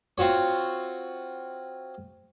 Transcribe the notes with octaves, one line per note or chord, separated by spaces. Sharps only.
C4 F4 F#4 C#5